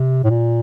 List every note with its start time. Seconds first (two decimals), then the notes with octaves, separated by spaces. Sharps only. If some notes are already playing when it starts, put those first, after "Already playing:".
Already playing: C3
0.24 A2
0.30 A#2